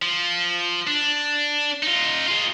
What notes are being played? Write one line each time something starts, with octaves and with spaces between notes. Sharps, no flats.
F3
D4
D#4 F4
F4 G#4